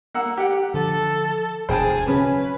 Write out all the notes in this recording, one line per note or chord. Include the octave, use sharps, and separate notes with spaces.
A#3 F#5 E6
G4 F#5
D3 F3 A4
E1 D2 B2 G#4 C5 G5 A5
C#3 F#3 C#4 B4